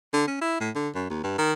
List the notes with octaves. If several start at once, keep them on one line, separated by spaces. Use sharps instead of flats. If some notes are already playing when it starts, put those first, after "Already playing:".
D3
C#4
E4
A2
D3
F#2
D#2
G2
D#3